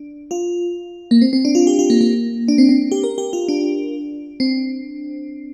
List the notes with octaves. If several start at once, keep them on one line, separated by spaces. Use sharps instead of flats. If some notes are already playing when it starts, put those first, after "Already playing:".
Already playing: D4
F4
A#3
C4
C4
D4
F4
G4
F4
A#3
A#3
D4
C4
C4
G4
A#4
G4
F4
D4
C4